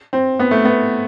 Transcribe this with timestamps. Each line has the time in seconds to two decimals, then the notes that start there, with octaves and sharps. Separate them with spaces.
0.13 C4
0.40 B3
0.51 A3
0.65 B3